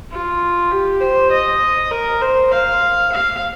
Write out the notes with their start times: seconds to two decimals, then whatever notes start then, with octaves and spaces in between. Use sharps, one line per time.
0.11 F4
0.71 G4
1.01 C5
1.31 D#5
1.91 A#4
2.21 C5
2.52 F5
3.12 F5